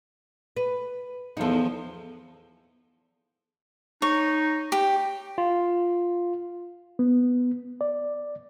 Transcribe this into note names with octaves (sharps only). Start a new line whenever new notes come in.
B4
E2 F3 D#4 A4
D#4 C#5
G4
F4
B3
D5